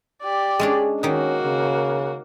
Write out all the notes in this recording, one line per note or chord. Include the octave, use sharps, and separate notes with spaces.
G4 D5
G#3 C#4 D4 G#4
D#3 A#3 C#4 D#4 F#4
C#3